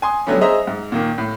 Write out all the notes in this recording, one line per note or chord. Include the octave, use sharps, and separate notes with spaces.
G#5 C6 D#6
D3 F#3 G3 A3 B3 C#4
G#4 C5 D#5 E5 A#5
G#2
A#2 D#3 A#3
A2